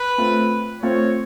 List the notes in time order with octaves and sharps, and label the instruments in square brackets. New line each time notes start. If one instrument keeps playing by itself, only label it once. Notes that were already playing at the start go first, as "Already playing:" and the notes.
Already playing: [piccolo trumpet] B4
[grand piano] A3 C4 F4
[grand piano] A3 C4 F4 [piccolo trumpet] C#5